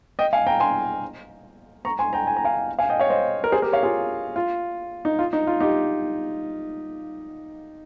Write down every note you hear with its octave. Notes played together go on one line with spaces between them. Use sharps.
D#5 G5
F5 G#5
G5 A#5
G#5 C6
A#5 C#6
G#5 C6
G5 A#5
G#5
A#5
F5 G#5
F5 G#5
D#5 G5
C#5 F5
C5 D#5
A#4
G#4 C5
G4 A#4
C#5 F5
F4 G#4
F4
D#4
F4
D#4
F4
D#4 G4